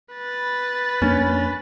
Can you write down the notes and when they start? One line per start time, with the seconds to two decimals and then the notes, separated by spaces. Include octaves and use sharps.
0.14 B4 A6
1.02 F2 A#3 C#4 D4